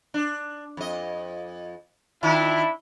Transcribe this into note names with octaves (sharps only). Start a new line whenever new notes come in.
D4
F2 D#5
D#3 D4 E4 F4